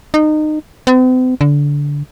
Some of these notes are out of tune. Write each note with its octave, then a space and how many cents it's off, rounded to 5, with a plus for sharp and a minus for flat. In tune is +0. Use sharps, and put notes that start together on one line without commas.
D#4 -25
C4 -45
D3 -20